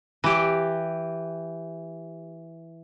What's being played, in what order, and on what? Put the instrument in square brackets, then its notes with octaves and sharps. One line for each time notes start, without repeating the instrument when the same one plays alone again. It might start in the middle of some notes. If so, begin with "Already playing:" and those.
[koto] E3 G4